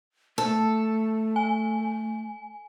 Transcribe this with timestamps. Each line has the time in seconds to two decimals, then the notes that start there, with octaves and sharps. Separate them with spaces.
0.38 A3 A4
1.36 G#5